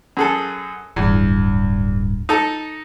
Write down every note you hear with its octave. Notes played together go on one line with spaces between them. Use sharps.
F#2 G#4 A4
D1 E2 G2
D#4 A4